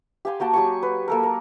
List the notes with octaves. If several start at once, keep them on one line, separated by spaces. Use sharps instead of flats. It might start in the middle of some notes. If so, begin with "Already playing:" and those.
G4 F5 G#5 C6
A#3 F#4 G5 A5
F#3 G4 G#5 C#6
B4
A#3 A4 A#4
A#4